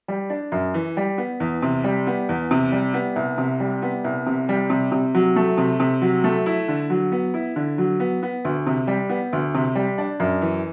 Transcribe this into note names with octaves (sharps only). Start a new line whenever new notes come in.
G3
D4
F#2
E3
G3
B3
E2
C3
G3
B3
E2
C3
G3
B3
C2
C3
G3
B3
C2
C3
G3
C3
C3
F#3
A3
C3
C3
F#3
A3
E4
D3
F#3
B3
E4
D3
F#3
B3
B3
D2
C3
G3
B3
D2
C3
G3
D4
F#2
E3